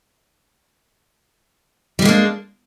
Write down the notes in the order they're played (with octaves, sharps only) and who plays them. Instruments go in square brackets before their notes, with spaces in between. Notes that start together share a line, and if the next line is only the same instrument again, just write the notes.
[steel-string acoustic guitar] G3
G#3
A#3
D4